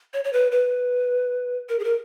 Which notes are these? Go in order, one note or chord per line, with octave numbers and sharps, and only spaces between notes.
C#5
C#5
B4
B4
A#4
G#4
A#4